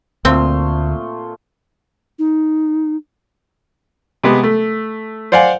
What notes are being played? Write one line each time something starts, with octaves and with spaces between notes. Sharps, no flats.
D2 A#2 A3 C4 C6
D#4
C3 G#3 B3
A3
C5 D5 F5 F#5 G#5